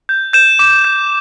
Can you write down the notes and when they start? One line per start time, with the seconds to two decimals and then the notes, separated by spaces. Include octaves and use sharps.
0.09 G6
0.33 G6 E7
0.59 D6 E7
0.85 G6